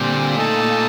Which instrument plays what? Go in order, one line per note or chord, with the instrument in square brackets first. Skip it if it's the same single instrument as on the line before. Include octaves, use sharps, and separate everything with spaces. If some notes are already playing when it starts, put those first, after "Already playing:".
Already playing: [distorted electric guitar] A#2 [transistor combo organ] D3 G3 C4
[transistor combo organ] A3 D#4 A4